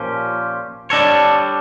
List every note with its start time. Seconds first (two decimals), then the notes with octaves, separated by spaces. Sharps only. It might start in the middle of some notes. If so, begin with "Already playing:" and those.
Already playing: A#2 F3 C#4 G4
0.90 G3 D4 A4 C#5